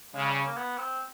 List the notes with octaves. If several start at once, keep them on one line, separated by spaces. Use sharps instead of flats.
C#3 G#3
G3
A#3
B3
C4